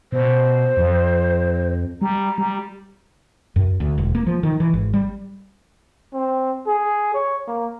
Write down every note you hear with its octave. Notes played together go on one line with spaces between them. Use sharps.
B2 C5
F2
G3 A#5
G3
F#2
D2
E1
A#3
F3
D#3
E3
G#1
G3
C4
G#4
C#5
A#3